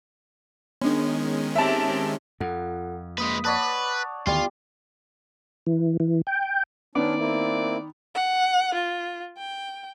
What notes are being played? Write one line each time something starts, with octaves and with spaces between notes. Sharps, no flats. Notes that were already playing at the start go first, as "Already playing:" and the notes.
D#3 G#3 B3 C#4 D4
C4 G4 E5 A5
F2 F4 A4 F#5
G#3 A#3 B4 D#6 B6
B4 C#5 D5 F#5 A5 D#6 F#6
D2 D#3 E3 G3 B3 F4
E3
E3
G5
D#3 B3 C#4 D4 D5
A#3 C4 E4
F#5
F4
G5